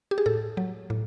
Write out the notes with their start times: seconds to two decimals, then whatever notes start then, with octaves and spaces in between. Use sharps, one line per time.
0.11 G4
0.18 G#4
0.26 A2 A4
0.57 F#3
0.90 A2